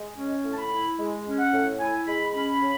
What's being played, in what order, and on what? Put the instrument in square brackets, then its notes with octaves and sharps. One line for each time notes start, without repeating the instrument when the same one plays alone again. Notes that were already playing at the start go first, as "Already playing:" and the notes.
Already playing: [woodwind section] G#3
C#4
A2
A5
B5
E4
G#3
C#4
F#5
A2
E4 G#5
G#3 B5
C#4 B5
C#3